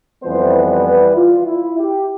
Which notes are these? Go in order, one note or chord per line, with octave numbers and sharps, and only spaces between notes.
F2 E3 G3 B3 C5
B4
B4
F4
E4
G4